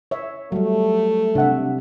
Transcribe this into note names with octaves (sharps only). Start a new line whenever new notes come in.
C#5 E5
F#3 G3 A3
C3 D4 E5 F#5